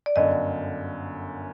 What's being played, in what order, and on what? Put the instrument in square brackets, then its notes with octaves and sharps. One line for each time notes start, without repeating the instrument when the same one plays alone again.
[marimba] D5
[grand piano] G1 F#2 D3 [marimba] D#5